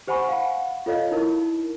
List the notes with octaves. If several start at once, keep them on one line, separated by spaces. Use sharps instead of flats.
G4 C5 F#5 G#5 B5 C#6
F5 F#5 B5
F4 A4 C#5 D#5 F5
D#4 E4 A#4